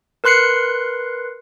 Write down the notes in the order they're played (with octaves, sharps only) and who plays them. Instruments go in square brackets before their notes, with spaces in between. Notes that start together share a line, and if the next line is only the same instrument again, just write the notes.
[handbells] A#4 B4 C6 F#6 C7 C#7